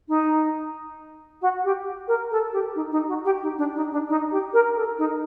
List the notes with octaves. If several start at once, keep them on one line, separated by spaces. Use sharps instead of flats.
D#4
F#4
G4
A#4
A4
G4
D#4
D#4
F#4
G4
D#4
D4
D#4
D4
D#4
G4
A#4
A4
D#4